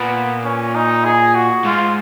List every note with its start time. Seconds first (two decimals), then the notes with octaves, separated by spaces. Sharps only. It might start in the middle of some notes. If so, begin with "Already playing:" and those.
Already playing: A#2 B3
0.45 C#4
0.75 D#4
1.05 G#4
1.35 F#4
1.65 G#2 F4